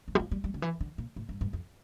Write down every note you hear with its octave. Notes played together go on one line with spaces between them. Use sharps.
G2
G3
F3
G3
G3
D3
E3
D3
A#2
A2
G2
G2
F2